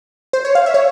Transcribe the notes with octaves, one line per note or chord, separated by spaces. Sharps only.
C5
C#5
F5
E5
C#5